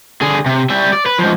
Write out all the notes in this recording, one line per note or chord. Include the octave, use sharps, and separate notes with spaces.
D3 G#4
C3
G3 E5
D5
B4
G#2 F3